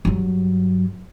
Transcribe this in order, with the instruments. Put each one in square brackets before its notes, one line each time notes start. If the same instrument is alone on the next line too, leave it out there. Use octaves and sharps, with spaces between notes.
[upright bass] G2 F#3